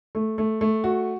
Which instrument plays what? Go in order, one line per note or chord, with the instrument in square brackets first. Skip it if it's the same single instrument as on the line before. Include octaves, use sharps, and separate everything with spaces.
[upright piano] A3
A3
A3
F#4